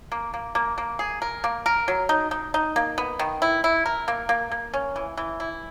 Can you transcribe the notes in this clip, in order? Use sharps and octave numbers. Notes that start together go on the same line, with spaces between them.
A#3
A#3
A#3
A#3
G#4
A#4
A#3
A#4
F#3
D#4
D#4
D#4
A#3
B3
D#3
E4
E4
A#4
A#3
A#3
A#3
C#4
E3
E3
E4